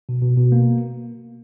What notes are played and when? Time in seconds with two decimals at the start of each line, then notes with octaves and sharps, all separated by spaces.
0.09 B2
0.22 B2
0.37 B2
0.52 A#3